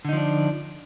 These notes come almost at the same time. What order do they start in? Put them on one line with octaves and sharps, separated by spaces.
D3 D#4 F3 D4